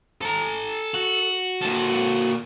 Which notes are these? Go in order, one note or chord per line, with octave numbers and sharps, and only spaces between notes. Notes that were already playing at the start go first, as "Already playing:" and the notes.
A4 A#5
F#4
A#2 A4